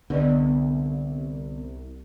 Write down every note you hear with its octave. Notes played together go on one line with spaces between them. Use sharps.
C2 D3 B3 B4 D5 D#5